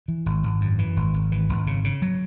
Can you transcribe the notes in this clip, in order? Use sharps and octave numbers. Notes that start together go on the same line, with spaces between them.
E3
G#1
G#1
F#2
E3
G#1
G#1
E3
G#1
C#3
C#3
F#3